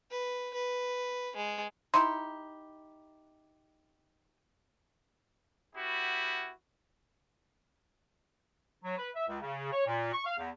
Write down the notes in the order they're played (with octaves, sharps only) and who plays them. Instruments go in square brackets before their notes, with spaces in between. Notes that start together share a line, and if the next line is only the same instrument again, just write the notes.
[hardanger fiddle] B4
B4
G#3
[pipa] D#4 E4 G4 [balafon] C6
[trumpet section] B3 E4 F#4 G4
[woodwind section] F#3
B4
E5
C#2
C#3
C#5
A#2
C#6
F5
E2